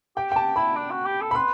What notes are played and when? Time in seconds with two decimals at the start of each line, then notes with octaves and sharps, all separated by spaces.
0.17 G4 G5
0.32 G5
0.36 G4 A5
0.56 E4 B5
0.76 D4
0.91 F#4
1.06 G4
1.21 A4
1.31 B5
1.35 B4 C6